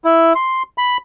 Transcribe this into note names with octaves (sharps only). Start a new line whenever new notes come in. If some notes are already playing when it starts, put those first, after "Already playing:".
E4
C6
B5